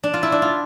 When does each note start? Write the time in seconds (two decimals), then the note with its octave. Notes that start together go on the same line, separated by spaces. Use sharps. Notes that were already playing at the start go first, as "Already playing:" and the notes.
0.03 D4
0.14 F4
0.23 E4
0.32 D4
0.42 F4